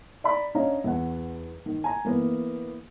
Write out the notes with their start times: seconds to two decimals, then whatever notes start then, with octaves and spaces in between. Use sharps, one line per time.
0.24 D5 A#5 B5
0.55 C#4 D4 C#5 D#5 F5 A#5
0.84 E2 F#5
1.66 D#3
1.84 G#5 A#5
2.05 E3 A#3 B3